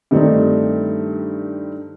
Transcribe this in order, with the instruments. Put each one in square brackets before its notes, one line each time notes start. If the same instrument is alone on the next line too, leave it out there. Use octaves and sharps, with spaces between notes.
[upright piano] G2 D#3 A3 C4 D4 D#4